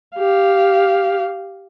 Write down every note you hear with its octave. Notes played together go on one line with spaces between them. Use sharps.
G4 F5